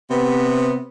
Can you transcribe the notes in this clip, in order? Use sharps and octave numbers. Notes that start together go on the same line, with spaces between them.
C3 B3